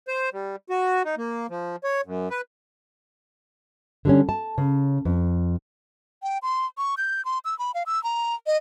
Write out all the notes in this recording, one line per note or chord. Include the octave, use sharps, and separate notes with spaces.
C5
G3
F#4
D#4
A#3
F3
C#5
F#2
B4
D3 G3 C#4
A5
C#3
F2
G5
C6
C#6
G6
C6
E6
B5
F5
E6
A#5
D#5